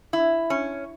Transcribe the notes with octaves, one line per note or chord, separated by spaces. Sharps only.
E4
C#4